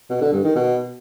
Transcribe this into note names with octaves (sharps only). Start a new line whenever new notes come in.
B2
D3
G2
D#3
B2